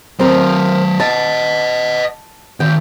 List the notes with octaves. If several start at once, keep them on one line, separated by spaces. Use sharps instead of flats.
F#3 C4 A#4 C5
D#5 F#5 A5
D#3 C4 G5